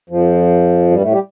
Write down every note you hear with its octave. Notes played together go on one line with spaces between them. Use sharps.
F2 F3
G2 G3
A2 A3
G3 G4